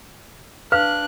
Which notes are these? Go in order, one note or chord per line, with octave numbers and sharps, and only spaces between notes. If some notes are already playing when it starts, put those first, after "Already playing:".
D4 B4 F5 F6 F#6